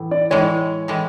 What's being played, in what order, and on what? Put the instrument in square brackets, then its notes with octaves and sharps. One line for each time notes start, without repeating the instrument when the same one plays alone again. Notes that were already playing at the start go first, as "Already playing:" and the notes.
Already playing: [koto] A2 E3
[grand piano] D5
[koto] A2 E3 G#3 [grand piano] C#5
[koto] A2 E3 G#3